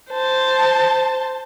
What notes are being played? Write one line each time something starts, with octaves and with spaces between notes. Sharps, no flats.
C5 A5